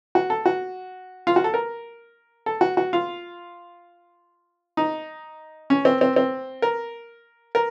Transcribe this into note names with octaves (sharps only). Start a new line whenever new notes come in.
F#4
A4
F#4
F4
F#4
A4
A#4
A4
F#4
F#4
F4
D#4
C#4
C4
C4
C4
A#4
A#4